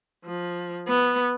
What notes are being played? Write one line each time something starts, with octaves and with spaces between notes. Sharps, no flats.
F3
B3